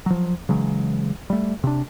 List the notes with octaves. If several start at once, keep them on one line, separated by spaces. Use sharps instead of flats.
F3 F#3
C#3 E3 F#3 G#3
G3 A3
C3 D4